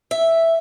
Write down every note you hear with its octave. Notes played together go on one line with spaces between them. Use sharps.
E5